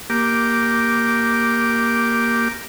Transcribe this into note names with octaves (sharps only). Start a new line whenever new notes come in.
A#3 G4 D6